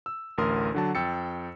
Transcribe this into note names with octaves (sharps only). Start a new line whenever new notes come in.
E6
A1 D2 A#4 C6 D#6
D3 F#3 A5
F2 G5 E6 A6 C#7